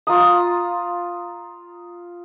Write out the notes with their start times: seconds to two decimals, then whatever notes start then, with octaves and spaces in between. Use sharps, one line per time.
0.07 F4 A#5 D#6